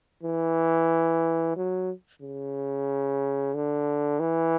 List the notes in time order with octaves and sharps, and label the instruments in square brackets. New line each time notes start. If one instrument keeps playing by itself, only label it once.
[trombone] E3
F#3
C#3
D3
E3